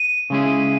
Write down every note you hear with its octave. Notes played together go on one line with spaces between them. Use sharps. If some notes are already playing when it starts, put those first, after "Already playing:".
Already playing: D#7
C#3 G#3 C#4 E4 G#4